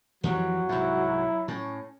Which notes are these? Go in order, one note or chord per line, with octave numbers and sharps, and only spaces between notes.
F2 E3 F#3 G3 F#4
C2 G#2 E4
A2 C#4